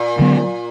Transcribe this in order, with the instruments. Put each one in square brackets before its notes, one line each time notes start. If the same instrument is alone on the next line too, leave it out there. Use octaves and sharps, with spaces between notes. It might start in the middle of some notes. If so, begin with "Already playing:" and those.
Already playing: [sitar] A#2
[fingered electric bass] D3 F#3 B3